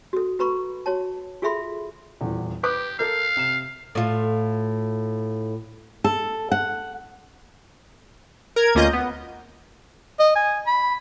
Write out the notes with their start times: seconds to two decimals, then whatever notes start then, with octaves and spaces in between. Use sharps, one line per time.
0.13 F#4 A4
0.39 F#4 B4 A#5 B5 C#6
0.86 F#4 C#5 A5
1.42 F4 G#4 A4 E5 B5 C6
2.21 D#1 E2
2.63 G4 B4 D6 F#6
2.99 A4 A#4 F5 G6
3.37 C3 E7
3.95 A2 F4
6.04 A4
6.51 F#5
8.56 A#4 A#5 G#6
8.75 D2 A#3 C#4 F4 D#5 G6
8.93 B3
10.19 D#5
10.35 G#5
10.66 B5